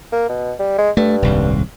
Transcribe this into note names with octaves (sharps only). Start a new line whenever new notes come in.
A#3
B2
G3
G#3
G2 A3
D#1 C2 G#2